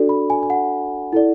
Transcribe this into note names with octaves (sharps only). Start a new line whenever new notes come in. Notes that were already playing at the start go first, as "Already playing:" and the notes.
Already playing: D4 F#4 A4 D5
B5
G#5
G#5
F#5
E4 A4 D5